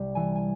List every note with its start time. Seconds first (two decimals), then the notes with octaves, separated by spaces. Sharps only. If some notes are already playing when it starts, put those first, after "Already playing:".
Already playing: C2 C3 G3
0.15 E3 G#5
0.35 G#5